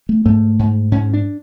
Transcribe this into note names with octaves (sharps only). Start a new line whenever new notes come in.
A3
G#2 A3
G#2
G#2 C#4
D4